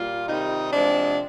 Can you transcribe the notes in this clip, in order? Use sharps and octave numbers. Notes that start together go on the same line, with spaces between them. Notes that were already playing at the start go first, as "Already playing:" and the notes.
Already playing: A#2 G3 F4
C3 D#3 G3 D#4
C3 F3 G#3 D4